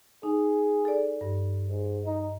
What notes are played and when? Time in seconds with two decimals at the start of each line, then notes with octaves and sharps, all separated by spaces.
0.23 D#4 G#4
0.85 A4 D5
1.21 G2
1.68 G#2
2.06 D#4